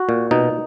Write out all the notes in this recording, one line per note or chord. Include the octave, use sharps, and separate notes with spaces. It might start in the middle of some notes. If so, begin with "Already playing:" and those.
Already playing: F#4
A#2
B2 D#4